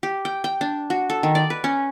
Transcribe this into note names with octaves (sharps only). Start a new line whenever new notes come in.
G4
G5
G5
D4
F#4
A4
D#3
D5
B4
C#4